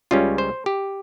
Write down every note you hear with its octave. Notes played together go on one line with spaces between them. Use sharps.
C#2 C#3 G3 C#4 F4
C5
G4